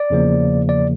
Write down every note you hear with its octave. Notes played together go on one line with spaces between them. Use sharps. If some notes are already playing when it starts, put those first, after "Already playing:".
Already playing: D5
E2 C#3 F3 A#3
D5